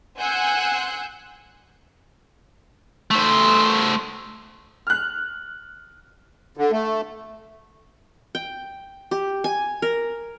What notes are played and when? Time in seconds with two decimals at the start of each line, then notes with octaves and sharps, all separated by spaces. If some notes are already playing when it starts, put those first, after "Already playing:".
0.20 F#5 G#5 C6 E6 F#6 G6
3.11 A3 C5
4.87 F6 F#6
6.57 D3
6.72 A3
8.35 G5
9.11 G4
9.44 G#5
9.82 A#4